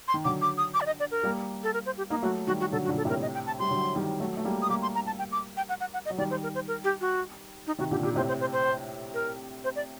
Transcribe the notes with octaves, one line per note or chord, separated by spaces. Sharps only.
C6
D#3
D3 F#3 D6
D6
D#6
D6
D5
D#5
D5
A#4
G3 A#3
A4
A#4
C5
G4
A#3 D#4
F#3 A3 F#4
D#3 G3 F#4
F#4
D3 F#3 A4
F#4
A#2 D3
A4
A2 C3 A#4
D#5
G5
A5
G3 C6
D3 F#3
D#3 G3
F#3 A3
A3
G3 A#3
D#6
G3 A#3 D6
C6
A#5
A5
G5
D6
G5
F#5
F#5
F#5
D#5
F#3
D#3 G3 D5
C5
A#4
C5
A#4
G4
F#4
D#4
C3 D#3 F#4
A#2 D3 G4
A#2 G4
A2 C3 C5
C5
C5
C5
A#4
C5
D5